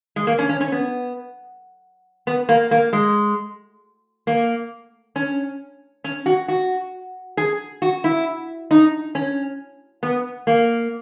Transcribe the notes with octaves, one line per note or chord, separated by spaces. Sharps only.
G#3
A#3
C#4
C#4
C#4
B3
B3
A#3
A#3
G#3
A#3
C#4
C#4
F#4
F#4
G#4
F#4
E4
D#4
C#4
B3
A#3